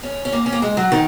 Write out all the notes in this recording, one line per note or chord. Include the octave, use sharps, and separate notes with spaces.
C#4
C#4
A#3
C#4
A#3
G#3
F#3
D#3